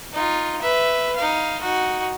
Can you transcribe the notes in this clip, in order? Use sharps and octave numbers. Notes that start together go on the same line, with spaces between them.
D#4 F4
B4 E5
D#4 F5
D#4 F#4